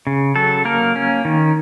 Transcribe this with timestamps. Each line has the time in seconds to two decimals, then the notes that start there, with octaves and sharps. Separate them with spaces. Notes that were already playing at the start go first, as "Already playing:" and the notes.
0.07 C#3
0.36 F#3 A4
0.65 A#3 A#4
0.96 C#4
1.25 D#3